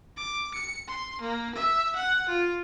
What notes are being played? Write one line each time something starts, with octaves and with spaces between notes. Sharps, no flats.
D6
C#7
C6
A#3
E5
F#5
F4